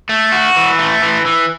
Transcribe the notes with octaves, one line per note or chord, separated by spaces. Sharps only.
A3
F#4
E3
A3
E3
E3